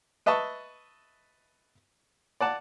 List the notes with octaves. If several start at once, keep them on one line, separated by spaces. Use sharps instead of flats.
B4 D#5 E5 A5 C#6
D5 F#5 A5